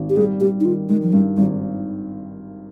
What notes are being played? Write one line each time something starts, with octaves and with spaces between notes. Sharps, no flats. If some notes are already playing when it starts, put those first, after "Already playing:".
Already playing: G#1
G4
G3 G#4
G3 G4
D#4
D#3 F4
D#3 G#3
F3
G2 G3
G#1 G3